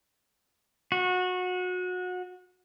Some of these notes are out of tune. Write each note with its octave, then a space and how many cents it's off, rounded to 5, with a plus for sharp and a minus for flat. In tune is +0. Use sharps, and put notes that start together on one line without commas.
F#4 -25